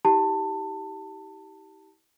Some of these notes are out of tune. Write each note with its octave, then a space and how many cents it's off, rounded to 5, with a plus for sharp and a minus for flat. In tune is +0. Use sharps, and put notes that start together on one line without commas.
E4 -45 G4 -10 A5 +20